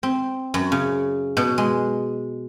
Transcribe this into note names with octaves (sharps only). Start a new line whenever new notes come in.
C4
F#2
C#3
B2
G#3